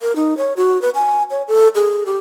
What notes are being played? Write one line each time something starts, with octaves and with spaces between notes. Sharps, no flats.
A#4
D#4
C#5
F#4
B4
G#5
C#5
A4
G#4
G4